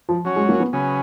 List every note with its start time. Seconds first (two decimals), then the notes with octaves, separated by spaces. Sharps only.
0.09 F3
0.25 F#3 C#4 F#4 C#5
0.36 G#3
0.49 A#3
0.60 B3
0.73 C#3 F#3 C#4 G#4 B4